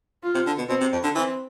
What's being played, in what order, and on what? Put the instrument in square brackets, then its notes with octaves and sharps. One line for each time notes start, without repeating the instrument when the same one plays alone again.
[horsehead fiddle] F4
[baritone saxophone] C3
D3
B2
[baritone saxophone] B2 [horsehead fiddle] C4
[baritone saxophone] C3
F2
D3
[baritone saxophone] E3 [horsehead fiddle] C4